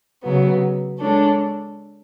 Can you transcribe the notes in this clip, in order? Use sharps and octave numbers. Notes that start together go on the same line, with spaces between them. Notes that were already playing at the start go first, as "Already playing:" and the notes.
C#3 F#3 B3
G#3 D4 A4 C#5